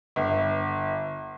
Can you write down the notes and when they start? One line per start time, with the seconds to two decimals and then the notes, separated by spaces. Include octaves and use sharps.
0.16 G1